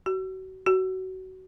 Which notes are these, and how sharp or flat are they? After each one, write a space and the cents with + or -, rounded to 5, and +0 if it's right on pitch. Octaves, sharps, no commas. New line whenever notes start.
F#4 +30
F#4 +20